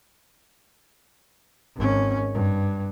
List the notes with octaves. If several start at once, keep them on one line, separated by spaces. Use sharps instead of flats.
G#1 C#4
G2